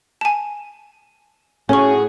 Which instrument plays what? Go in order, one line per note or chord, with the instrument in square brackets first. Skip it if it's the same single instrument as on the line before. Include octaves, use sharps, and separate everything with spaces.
[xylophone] G#5 A5
[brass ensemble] A2 F#4 G#4 [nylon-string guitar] C#4 [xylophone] C#5 C#6